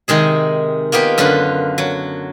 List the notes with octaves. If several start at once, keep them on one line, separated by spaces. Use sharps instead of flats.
C3 D#3 G#3 G#4
A#3 B3 F4 G4
F#2 D3 F4 B4 B5
F#3